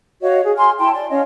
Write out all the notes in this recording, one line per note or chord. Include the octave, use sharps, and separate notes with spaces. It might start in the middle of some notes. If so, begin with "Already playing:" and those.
F#4 C#5 D#5 F5
G#4
G#5 C6 F6
E4 G5 A5 C6
D5 C6
C#4 C#5 D#5 F5